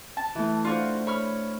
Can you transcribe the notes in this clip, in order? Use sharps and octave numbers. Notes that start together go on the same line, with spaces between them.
A5
E3 A3
D4 F4 F#4 C5
C#5 B5 F6